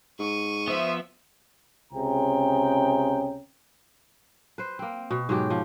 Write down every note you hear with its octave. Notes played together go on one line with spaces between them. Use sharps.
G#2 C#6 D#7
F3 B3 C5 E5
C#2 C3 C#4 G#4 G5 A#5
B4 C5
A#3 C4
B2
G#2 F#3 G4
F3